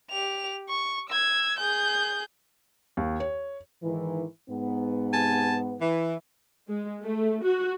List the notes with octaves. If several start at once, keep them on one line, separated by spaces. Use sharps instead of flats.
G4 F7
C#6
E6 G#6
G#4 G6
D#2
C#5
G#2 D#3 E3
G#2 B3
C3 G#5 A5
E3
G#3
A3
F#4